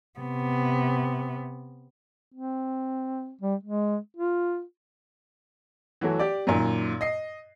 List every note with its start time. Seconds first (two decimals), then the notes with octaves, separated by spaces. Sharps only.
0.19 C3 B3
2.34 C4
3.41 G3
3.63 G#3
4.17 F4
6.01 E3 F#3 A3 F#4
6.19 G4 D5
6.47 F#2 A#2 D#3
7.01 D#5 C7